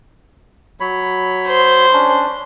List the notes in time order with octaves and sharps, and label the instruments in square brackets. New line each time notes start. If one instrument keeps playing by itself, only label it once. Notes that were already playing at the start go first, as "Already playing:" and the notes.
[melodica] F#3 C#5 B5
[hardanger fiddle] C5
[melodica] C#4 D4